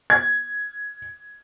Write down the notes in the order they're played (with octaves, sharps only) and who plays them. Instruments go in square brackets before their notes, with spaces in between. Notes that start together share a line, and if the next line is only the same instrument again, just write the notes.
[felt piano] G#6